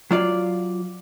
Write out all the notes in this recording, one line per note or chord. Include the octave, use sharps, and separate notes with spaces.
F#3 F4 D5